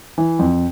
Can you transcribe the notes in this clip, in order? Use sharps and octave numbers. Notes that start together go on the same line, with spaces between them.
E3
F2